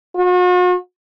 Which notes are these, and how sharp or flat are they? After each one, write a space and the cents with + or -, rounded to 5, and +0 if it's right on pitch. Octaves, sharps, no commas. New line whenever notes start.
F#4 -45